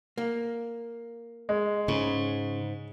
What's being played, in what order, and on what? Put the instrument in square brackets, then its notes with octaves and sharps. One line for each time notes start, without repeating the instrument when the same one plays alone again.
[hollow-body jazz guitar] A#3
[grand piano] G#3
[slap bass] G#2 [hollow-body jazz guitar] C#3